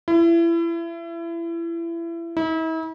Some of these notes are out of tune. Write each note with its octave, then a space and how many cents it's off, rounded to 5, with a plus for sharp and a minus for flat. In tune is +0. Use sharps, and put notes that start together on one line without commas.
E4 +30
E4 -40